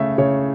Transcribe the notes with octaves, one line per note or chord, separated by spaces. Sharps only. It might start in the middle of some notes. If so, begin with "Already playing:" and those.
Already playing: C#3 A3 E5
C#3 C#5